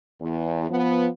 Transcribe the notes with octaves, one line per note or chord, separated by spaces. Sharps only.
E2
F3 B3